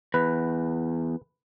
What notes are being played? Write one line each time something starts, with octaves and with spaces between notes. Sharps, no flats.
E2 B4